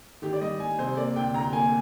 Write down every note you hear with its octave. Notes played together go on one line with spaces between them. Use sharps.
D#3 G4
D5
G3 D#5
G3 G#5
C3 C5
A#3 D5
D2 G5
D2 A#5
A#3 G#5